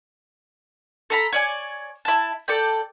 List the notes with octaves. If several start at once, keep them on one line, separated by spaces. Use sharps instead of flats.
A4 A#5 B5
C#5 D5 G#5
E4 A5
A4 D5 G5